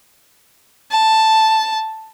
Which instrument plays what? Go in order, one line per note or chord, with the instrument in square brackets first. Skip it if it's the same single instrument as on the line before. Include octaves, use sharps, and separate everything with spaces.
[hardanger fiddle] A5